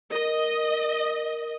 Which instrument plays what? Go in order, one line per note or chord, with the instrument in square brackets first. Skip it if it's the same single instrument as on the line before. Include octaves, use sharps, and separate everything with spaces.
[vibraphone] A#4 [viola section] D#5